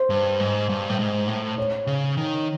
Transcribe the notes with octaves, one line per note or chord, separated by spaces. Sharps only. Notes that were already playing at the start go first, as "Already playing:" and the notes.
Already playing: C5
G2
G#2
G2
A2
G#2
A2
C#5
C#3
D#3